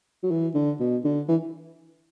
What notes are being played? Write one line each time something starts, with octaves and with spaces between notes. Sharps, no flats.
F#3
E3
D3
B2
D3
E3